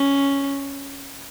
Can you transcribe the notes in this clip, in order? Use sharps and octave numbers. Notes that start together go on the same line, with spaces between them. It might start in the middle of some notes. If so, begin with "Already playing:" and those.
Already playing: C#4